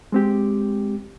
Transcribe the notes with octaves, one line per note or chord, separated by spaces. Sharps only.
G#3 C4 G4